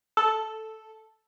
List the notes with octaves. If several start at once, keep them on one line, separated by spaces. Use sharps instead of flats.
A4